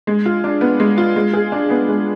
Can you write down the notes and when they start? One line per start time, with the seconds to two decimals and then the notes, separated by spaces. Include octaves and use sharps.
0.07 G#3
0.26 F4
0.44 D4
0.61 B3
0.80 G#3
0.98 F4
1.16 G#3
1.33 G#4
1.52 D4
1.70 B3
1.88 G#3